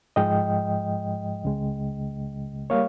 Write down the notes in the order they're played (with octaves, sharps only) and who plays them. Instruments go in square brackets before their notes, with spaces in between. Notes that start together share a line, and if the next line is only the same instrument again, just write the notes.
[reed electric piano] G#2 F3 G#3 D#5 G5
C#2 C#3 G#3
G3 A#3 C#5 F5